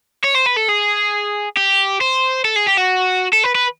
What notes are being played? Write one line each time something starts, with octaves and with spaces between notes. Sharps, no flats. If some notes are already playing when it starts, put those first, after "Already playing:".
C#5
C5
B4
A4
G#4
G4
C5
A4
G#4
G4
F#4
A4
B4
B4